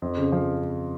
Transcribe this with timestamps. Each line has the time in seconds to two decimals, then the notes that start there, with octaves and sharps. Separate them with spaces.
0.02 F2
0.17 C#3
0.32 F3